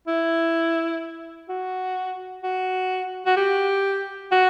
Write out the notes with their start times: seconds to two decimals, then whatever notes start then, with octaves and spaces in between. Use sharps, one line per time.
0.07 E4
1.49 F#4
2.43 F#4
3.26 F#4
3.36 G4
4.31 F#4